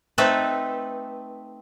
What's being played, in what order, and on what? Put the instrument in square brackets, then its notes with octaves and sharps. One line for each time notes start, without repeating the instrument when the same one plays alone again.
[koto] A3 C4 D#4 A4 B4